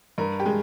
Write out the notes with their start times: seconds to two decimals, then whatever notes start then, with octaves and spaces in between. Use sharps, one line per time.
0.18 G2 A#4
0.40 G4
0.46 G#3